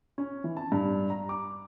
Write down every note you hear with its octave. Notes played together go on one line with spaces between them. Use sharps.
C#4
E3
A5
G2
A#5
D6